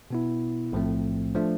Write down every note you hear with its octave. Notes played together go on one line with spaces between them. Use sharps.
B2 B3 E4
B1 A2 F3 A3 C4
F3 A3 D4